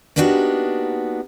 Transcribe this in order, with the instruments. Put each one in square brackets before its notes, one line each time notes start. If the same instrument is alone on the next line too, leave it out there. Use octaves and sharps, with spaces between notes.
[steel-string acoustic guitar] A#3 B3 D4 D#4 F#4 G4